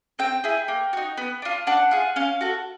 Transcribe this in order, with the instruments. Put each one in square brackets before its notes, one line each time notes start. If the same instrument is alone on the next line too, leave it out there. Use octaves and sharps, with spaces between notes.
[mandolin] C4 G5
E4 G#4
A#3
D#4 F#4
B3
D4 F4
D4 F#5
F4 G#4
C#4 F5
F#4 A4